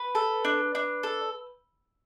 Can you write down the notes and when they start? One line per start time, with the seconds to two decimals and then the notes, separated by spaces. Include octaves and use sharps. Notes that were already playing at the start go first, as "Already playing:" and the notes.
Already playing: B4
0.15 A4
0.45 D4
0.75 D4
1.03 A4